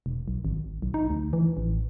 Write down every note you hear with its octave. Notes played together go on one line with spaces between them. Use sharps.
E1
B1
G#1
B1
D#4
D2
E3
A1